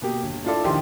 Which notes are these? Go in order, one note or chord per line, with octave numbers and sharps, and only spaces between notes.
B2 A#3 G4
G1
D4 E4 F4 A4 D5
A#1 D#3 E4 G4 C6